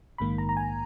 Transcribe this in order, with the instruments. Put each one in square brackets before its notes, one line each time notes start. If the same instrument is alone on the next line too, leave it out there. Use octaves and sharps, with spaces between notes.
[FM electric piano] A#1 G#2 D#3 A#3 B5
A#5
A#5
G#5